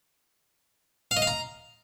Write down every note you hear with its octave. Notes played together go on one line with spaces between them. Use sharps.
F5
D#5
F5
A#5